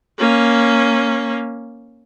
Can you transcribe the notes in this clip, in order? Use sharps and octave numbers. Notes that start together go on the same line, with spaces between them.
A#3 C#4